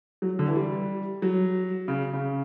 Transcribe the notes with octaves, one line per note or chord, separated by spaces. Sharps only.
F#3
D3
E3
G3
F#3
C#3
C#3